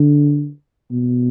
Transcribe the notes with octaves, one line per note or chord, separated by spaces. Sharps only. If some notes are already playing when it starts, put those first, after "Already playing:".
Already playing: D3
B2